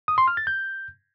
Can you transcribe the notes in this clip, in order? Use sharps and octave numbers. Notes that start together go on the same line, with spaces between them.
D#6
C6
F6
A6
G6